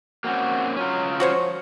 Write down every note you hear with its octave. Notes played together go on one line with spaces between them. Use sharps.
A#3 C4 C#4 F#4
F#3 C#4 F4
F3 F#4 C5 C#5